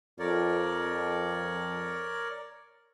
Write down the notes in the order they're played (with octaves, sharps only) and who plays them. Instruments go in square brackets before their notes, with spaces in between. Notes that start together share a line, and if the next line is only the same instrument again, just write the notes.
[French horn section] F2 [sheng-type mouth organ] A#4 C#5 D5